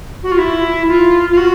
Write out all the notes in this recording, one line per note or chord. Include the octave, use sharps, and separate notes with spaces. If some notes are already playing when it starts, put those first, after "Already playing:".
F#4
F4
E4
F4
F4
F#4